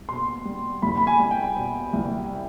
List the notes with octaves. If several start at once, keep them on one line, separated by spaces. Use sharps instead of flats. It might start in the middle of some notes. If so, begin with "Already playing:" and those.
Already playing: C2
B2 C6
G3
C2 B5
B5
G#5
G3
G5
B2
C2